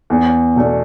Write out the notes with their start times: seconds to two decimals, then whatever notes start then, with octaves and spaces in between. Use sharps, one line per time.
0.10 E2
0.56 B2 A3 D4